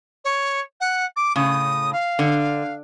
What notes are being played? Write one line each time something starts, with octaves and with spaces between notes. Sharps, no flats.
C#5
F#5
D6
A2 C#3 D#6
F5
D3